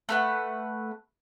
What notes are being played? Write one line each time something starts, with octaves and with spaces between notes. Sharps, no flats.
A3 B4 F#5